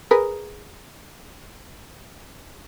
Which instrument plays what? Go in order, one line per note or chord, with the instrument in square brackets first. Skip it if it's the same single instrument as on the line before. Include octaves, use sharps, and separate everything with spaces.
[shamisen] G#4 A#4 B4